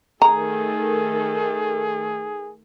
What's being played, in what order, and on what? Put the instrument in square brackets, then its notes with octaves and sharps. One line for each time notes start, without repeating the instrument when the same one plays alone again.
[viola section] D#3 A3 A4 [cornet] G#4 [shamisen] A#5